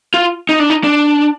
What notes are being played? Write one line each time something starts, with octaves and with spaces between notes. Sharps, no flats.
F4
D#4
D4
D#4
D4